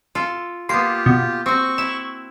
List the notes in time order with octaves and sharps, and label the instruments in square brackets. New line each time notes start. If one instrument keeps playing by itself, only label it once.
[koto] F4 A4
[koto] A#3 B3 [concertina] F4 G4 [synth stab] C6
[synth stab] B2
[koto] C4 F#4 [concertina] C#6
[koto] E4 [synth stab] E7